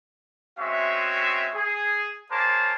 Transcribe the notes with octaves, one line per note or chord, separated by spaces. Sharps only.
G#3 C4 C#4 F#4 E5
G#4
A#3 G#4 A#4 C5 C#5 A5